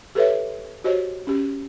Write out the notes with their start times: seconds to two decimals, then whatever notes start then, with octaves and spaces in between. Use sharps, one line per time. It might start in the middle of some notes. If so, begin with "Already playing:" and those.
0.15 G4 A4 B4 C#5 E5
0.84 F#4 G4 C5 C#5 D#5
1.27 C#4 G4